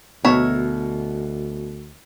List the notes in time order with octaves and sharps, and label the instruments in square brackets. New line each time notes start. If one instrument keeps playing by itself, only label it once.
[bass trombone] D2 [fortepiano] B2 [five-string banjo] A#4 C#5 E5